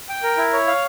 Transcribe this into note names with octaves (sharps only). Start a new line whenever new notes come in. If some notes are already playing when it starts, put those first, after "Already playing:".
G5
A#4
E4
C#5
F5